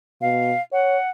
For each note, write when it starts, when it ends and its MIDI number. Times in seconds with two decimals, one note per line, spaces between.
0.21 0.53 47
0.21 0.61 77
0.73 0.97 73
0.73 1.10 78